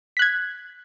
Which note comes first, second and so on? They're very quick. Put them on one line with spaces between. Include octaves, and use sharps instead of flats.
B6 F#6 G#6